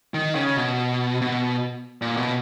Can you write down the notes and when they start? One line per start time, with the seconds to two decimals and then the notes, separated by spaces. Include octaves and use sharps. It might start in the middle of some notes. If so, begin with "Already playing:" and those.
0.14 D#3
0.35 C#3
0.57 B2
1.22 B2
2.02 A#2
2.17 B2